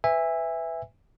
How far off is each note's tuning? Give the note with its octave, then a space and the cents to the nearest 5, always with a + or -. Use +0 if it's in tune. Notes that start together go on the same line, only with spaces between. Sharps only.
B4 +20 E5 +0 G#5 -25